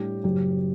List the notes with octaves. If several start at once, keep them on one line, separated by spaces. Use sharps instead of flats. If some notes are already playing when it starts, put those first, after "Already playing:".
Already playing: A2 G3 D4 G4
F#1 F#2 F#3 G4